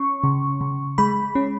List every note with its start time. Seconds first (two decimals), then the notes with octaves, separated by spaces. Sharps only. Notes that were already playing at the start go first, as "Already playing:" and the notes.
Already playing: C#4 C#6
0.24 C#3
0.61 C#3
0.98 G#3 B5
1.35 C#4